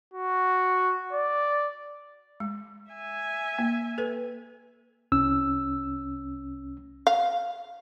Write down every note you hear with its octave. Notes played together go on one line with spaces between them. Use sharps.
F#4
D5
G#3
E5 G#5
A#3
A4 B4
C2 C#4 E6
F5